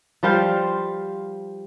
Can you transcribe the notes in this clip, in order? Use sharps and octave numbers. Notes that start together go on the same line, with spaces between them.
F3 G3 C5 F5